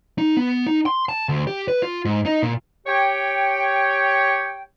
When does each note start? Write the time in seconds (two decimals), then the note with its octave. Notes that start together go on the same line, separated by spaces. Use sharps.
0.18 D#4
0.37 B3
0.67 D#4
0.86 C6
1.09 A5
1.29 D2
1.47 G4
1.68 B4
1.83 F4
2.05 G#2
2.26 D#4
2.43 A#2
2.87 G4 C#5 G5